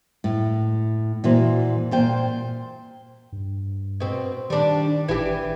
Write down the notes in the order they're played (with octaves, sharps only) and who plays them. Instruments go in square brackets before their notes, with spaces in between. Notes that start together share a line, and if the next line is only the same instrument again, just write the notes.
[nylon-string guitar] A2
A#2 E3 F#4 C5
A#2 C5 G5
[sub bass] G2
[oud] B2 C4
[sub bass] D#3 [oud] G3 D4
[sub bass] G#1 [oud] E3 G4